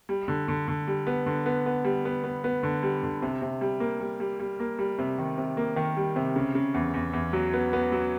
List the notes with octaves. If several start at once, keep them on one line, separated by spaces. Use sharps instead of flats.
G3
D3
D3
D3
G3
B3
D3
B3
B3
G3
B3
B3
B3
D3
G3
D3
C3
C3
G3
A#3
G3
G3
G3
A#3
G3
C3
D#3
C3
A#3
D#3
G3
C3
C#3
C#3
E2
E2
E2
F#3
B3
B3
F#3